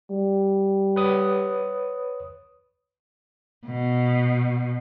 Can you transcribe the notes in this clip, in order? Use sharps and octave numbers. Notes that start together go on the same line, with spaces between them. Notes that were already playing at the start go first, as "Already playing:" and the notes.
G3
B4 C#5 D#6
B2